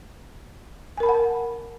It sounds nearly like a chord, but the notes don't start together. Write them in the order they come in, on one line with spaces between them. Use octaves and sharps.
G#5 A#4 B5 A5 F#5